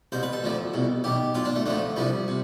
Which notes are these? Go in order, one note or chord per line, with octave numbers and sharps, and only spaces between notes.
C2 B2 C5
B4
A4
D2 D3 F3
C2 B2
B1 B2 G4
B1 B2 F4
D4
A3
D2 D3 F3 A3
C2 C3 F3 G3
C3